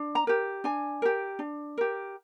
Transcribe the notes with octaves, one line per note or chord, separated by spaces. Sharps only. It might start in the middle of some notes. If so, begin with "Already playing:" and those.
Already playing: D4
A#5
G4 A#4
D4 G#5
G4 A#4
D4
G4 A#4